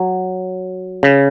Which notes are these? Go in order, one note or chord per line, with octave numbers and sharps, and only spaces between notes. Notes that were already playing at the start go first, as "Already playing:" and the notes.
Already playing: F#3
C#3